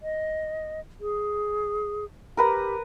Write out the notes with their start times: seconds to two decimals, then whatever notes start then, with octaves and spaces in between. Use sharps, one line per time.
0.02 D#5
1.01 G#4
2.37 G4 A#4 B4 A#5